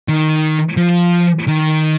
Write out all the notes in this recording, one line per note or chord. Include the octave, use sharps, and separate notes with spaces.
D#3
F3
D#3